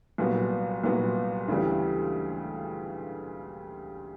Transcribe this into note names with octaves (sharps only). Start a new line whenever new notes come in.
C2 A#2 F#3 B3
C2 A#2 F#3 B3
D2 C#3 E3 G3